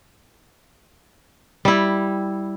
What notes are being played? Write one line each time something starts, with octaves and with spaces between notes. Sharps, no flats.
G3 E4